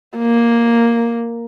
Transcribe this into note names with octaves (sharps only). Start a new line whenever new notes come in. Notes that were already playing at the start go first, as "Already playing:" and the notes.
A#3